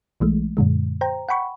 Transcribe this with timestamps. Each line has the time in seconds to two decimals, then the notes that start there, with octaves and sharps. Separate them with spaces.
0.20 B1 E3 G#3 A3
0.57 F#2 A#2 D3 G#3
1.01 C5 G5 A#5
1.29 F#5 G5 B5 C#6